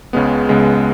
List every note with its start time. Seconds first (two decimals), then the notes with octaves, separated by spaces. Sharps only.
0.13 C#2 C#3 G#3 B3
0.49 C#2 C#3 G#3 B3